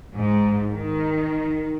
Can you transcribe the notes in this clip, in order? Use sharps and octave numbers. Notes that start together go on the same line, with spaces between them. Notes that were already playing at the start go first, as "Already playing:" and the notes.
G#2
D#3